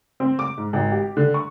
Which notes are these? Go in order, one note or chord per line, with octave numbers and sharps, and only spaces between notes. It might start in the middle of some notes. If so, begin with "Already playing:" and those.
C4
D6
G#2
G#1
G4
D3
C#6